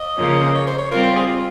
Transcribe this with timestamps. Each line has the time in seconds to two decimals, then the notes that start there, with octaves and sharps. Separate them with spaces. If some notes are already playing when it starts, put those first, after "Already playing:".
Already playing: D#5
0.17 C#3 F3 A#3 C#4
0.55 C#5
0.67 C5
0.78 C#5
0.90 G3 C4 F4 A#4
1.02 C5
1.15 G#4
1.27 F4